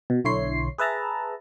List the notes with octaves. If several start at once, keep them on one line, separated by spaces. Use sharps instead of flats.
B2
B1 D3 E4 C#5 C6 C7
G#4 B4 E5 A5 A#5